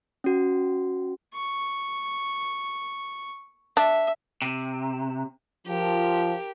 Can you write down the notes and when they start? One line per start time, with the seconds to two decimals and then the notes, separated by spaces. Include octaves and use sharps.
0.24 C#4 F#4
1.34 C#6
3.77 D4 E5
4.42 C3
5.67 F3 G4 A#4